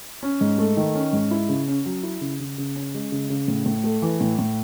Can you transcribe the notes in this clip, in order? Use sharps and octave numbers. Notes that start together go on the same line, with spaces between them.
C#4
G#2
A3
D#3
C#4
G#2
E4
C#3
C#4
F#3
E4
C#3
C#3
C#3
C#4
G#3
C#3
C#3
A2
A2
A3
E3
A2
A2